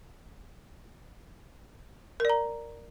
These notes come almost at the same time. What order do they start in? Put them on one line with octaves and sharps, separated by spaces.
A#4 D5 A#5